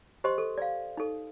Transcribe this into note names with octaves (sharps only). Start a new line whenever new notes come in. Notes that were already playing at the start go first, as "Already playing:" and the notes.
G4 C5 D#5 C6
A4
D5 F5
D#4 A4